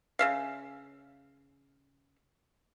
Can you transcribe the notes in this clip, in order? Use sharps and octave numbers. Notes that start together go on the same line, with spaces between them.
C#3 E5 F5